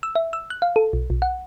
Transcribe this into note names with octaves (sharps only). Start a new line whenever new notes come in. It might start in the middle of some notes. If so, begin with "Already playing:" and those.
E6
E5
E6
F#6
F5
A4
B1
B1
F#5